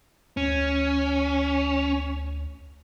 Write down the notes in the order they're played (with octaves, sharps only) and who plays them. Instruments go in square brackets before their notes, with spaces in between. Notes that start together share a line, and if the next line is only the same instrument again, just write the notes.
[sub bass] D2 [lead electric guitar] C#4